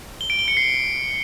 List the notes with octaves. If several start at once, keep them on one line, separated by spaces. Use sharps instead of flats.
G7
D7
G7
C#7
C7